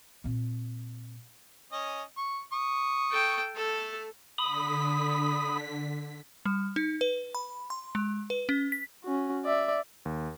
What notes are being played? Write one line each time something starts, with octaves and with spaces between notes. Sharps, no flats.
A#2 C4
C#4 D#5
C#6
C#6 D#6
A4 G5
A3 A4
D3 B5 D#6 B6
G3
D#4
B4
B5
C6
G#3
B4
C#4
B6
C#4 F#4
D5 E5
D#2